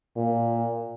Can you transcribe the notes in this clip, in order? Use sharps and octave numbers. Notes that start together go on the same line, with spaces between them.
A#2